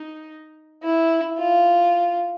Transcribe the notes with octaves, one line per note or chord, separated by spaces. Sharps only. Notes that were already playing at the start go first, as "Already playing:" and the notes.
Already playing: D#4
E4
F4